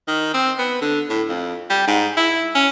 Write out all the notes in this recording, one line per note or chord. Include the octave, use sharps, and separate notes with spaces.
D#3
C4
B3
D3
A2
F2
G3
G#2
E4
C#4